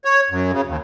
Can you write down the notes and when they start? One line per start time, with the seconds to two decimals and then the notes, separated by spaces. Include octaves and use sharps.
0.05 C#5
0.30 F#2
0.53 C#3
0.67 D#2